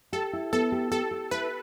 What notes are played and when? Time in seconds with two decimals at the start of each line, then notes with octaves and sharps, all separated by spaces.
0.13 G4 A4
0.33 E4
0.53 B3 A4
0.72 G4
0.91 G4 A4
1.11 G4
1.31 E4 B4